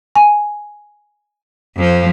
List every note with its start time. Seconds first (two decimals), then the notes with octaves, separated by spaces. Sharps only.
0.16 G#5
1.77 F2 F3